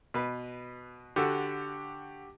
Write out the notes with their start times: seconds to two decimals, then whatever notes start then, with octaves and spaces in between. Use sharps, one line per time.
0.14 B2 B4
1.16 D3 F#4 G4 A4